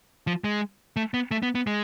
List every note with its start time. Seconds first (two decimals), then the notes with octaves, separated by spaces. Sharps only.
0.27 F3
0.44 G#3
0.96 A3
1.14 B3
1.31 A3
1.43 B3
1.55 B3
1.67 G#3